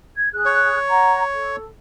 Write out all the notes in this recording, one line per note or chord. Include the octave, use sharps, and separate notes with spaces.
G#6
G#4 F#6
C#5
F#5 A#5
A4